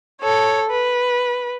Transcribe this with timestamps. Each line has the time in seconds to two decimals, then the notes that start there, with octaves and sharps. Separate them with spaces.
0.22 A4 C#5
0.70 B4